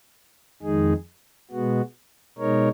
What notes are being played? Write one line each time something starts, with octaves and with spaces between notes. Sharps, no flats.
F2 D#3 G#3 D#4 G#4
B2 G#3 B3 F#4
B2 G#3 D#4 A#4 C#5